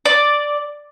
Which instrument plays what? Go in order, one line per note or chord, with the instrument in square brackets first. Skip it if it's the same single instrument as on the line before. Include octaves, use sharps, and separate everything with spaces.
[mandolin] D5